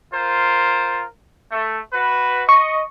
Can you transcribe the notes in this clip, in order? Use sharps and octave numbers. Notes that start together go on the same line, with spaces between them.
F4 A#4 C5
A3
F#4 B4
D#5 C#6